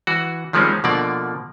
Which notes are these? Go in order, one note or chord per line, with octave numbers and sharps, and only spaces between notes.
E3 F#4
D#3 F3 G3 G#3 C4 C#4
B2 D3 F3 A#3 D5